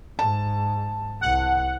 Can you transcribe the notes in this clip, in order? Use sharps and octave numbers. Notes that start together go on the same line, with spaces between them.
G#2 A5
C2 F#5